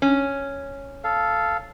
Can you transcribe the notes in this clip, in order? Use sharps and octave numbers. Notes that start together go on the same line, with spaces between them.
C#4
A4 F5